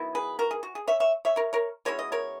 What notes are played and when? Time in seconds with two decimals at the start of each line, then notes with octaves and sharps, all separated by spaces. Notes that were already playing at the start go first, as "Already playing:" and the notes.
Already playing: D#3 F#3 B3 E4
0.15 G#4 B4
0.39 F#4 A#4
0.51 G#4
0.63 F#4
0.75 G#4
0.87 C#5 E5
1.00 C#5 E5
1.25 C#5 E5
1.36 A#4 C#5
1.53 A#4 C#5
1.85 B2 G#3 C#4 E4 C#5
1.99 D#5
2.12 A#4 C#5